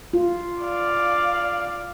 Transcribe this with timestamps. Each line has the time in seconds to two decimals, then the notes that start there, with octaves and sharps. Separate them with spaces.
0.13 F4
0.63 D5 F5